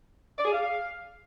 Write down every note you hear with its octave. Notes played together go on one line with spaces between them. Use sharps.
D5
G#4
F5